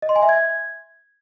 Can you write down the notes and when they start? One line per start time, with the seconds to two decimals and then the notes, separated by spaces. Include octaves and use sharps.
0.02 D#5
0.09 C6
0.16 G#5
0.22 E5
0.29 G#6